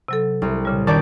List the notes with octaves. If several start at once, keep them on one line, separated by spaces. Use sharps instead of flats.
C3 F#3 A4
C2
A#2 C#3 G3
F2 D#3 C#4 D5 D6 G6